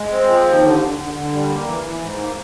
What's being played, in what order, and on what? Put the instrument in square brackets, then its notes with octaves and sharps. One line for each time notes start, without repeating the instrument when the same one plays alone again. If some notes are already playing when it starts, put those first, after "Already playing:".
Already playing: [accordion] G#3
C4
F3
D#2
D3
D3
D3
D3
G3
A#3
E3
E3
G#2
A#3